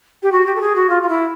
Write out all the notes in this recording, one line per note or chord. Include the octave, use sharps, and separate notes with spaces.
G4
F#4
G4
A4
G#4
F#4
F4
F4
E4